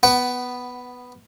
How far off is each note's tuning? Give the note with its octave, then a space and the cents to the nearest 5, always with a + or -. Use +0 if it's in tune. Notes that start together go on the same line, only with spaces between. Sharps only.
B3 +0 F#5 +20